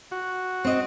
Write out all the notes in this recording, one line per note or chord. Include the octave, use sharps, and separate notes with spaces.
F#4
C4 D#5